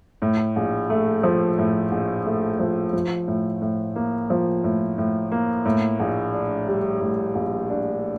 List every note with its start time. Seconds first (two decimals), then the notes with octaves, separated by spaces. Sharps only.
0.22 A2
0.56 A#1
0.90 A3
1.23 F3
1.58 A2
1.91 A#1
2.26 A3
2.59 F3
2.93 F3
3.28 A2
3.61 A2
3.96 A#3
4.30 F3
4.64 A2
4.98 A2
5.31 A#3
5.65 A2
6.00 A#1
6.34 D4
6.67 G3
7.01 A2
7.35 A#1
7.70 D4